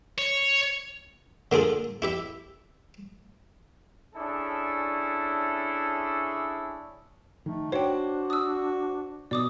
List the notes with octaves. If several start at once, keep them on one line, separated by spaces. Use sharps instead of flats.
C#5
D3 A#3 F4 G#4 A4
E4 G4 E5
C#4 D4 E4 G#4 A4
D#3 A3
D4 F#4 C5 C#5 G5
D#6 E6
B2 D5 D6 D#6